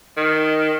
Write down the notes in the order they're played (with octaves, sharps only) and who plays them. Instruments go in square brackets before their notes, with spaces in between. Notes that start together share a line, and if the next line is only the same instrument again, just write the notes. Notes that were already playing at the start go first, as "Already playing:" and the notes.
[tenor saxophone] D#3